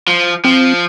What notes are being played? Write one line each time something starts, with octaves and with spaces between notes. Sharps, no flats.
F3
F3 C4